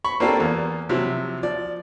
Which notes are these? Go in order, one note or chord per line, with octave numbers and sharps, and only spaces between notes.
B5 C#6
A#3 C4 D4 F4 G4 A4
E2 A#3
C3 F3 F#3 E4
F3 D5